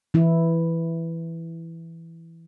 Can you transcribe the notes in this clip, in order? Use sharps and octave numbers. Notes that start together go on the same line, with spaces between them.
E3 E4